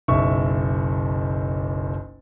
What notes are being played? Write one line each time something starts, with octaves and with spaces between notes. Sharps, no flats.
F#1 B1 E5 C#6